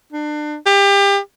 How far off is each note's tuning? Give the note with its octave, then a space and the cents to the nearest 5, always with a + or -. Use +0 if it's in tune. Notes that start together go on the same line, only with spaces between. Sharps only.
D4 +35
G4 +30